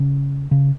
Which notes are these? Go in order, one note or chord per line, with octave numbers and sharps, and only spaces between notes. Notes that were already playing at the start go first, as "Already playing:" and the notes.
Already playing: C#3
C#3